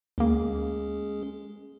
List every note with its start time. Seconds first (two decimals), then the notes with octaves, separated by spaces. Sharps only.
0.18 D2 G#3 A#3 C#4 G#4